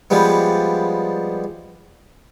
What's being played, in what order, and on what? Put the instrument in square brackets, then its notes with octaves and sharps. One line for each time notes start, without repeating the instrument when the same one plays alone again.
[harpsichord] F3 G3 G#3 B3